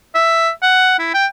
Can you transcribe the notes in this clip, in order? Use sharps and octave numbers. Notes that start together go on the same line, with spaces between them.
E5
F#5
E4
G5